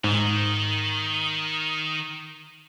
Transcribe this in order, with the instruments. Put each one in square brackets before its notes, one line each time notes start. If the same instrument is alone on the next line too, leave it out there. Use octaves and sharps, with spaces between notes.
[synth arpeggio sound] G#2 [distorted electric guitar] D#3